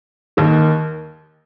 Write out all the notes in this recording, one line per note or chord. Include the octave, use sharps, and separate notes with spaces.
D#2 D#3